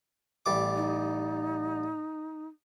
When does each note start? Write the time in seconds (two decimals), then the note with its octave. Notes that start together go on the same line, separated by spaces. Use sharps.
0.46 A1 G3 D6
0.75 D#4